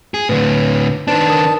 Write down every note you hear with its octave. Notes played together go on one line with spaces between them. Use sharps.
G#4
A2 D3 B4
D#3 D4 B4 C5 D5 A5
A#4 D#6